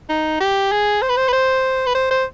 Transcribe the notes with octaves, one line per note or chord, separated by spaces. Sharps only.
D#4
G4
G#4
C5
B4
C5
B4
C5
B4
C5
C5